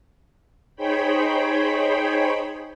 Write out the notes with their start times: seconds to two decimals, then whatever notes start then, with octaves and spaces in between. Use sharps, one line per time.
0.76 D#4 G#4 C5 C#5 G5 B5